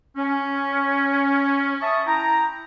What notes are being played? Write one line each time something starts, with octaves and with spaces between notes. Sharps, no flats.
C#4
E5 A5 C#6 D#6
E4 G5 A#5